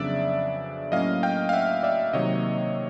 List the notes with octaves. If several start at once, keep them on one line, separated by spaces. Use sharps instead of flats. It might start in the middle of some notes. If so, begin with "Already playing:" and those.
Already playing: F2 C#3 F#3 B3 D4 D5 E5
A2 F#3 A#3 C#4 D#5 F5
F5 G5
F5
E5 F#5
D5 E5
C3 D#3 F#3 A#3 C#5 D#5